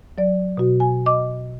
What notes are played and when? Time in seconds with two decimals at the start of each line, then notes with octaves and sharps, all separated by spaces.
0.18 F#3 D5
0.57 B2 F#4
0.80 G#5
1.06 D#5 D6